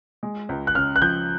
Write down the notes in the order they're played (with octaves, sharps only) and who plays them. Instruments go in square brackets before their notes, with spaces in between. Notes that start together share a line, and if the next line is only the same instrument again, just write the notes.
[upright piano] G#3
C#2
[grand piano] F#6
[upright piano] C#3 [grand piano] F6
[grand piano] F#6
[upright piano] F3 [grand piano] G6